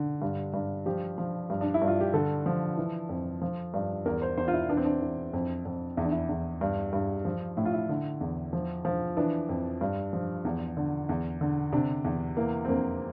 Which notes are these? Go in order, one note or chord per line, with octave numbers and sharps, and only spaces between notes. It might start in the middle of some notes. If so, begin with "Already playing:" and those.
Already playing: D3
G2
G2
F3 G4
F3
G2
D4
E4
G2
F4
G4
D3 A4
F3
E3
F2
F3
G2
E2 A#4
C5
E2 C5
F4
E4
E3 D4
C4
D4
E3
F2
F2
E2 E4
D4
E4
E2
G2
G2
F3
A2 E4
F4
E4
D3
E2
F3
F3
E3 D4
F2
G2
F3
E2
D3
E2
D3
C3 D4
E2
E3 A#3
C4
F2 A#3